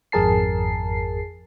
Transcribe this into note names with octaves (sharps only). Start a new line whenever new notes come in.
G#1 F2 G#4 A#4 A5 C7